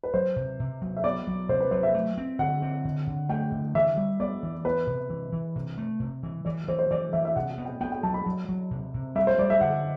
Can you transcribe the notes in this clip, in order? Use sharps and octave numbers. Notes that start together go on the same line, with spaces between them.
B4
F#3 C5
C3
C3
F#3
E5
B3 D5
F#3
C3 C5
B4
F#3 C5
E5
A3
C4
D3 F#5
C4
D3
D3
A3 G5
D3
E3 E5
G3
B3 D5
E3
B3 B4
C3
E3
E3
C3
A3
C3
E3
E3 D5
E3 C5
C5
E3 D5
E3 E5
E5
C3 F#5
F#5
B3
G5
B3 G5
G5
F#3 A5
B5
F#3
F#3
C3
C3
G3 E5
C5
G3 D5
E5
D3 F#5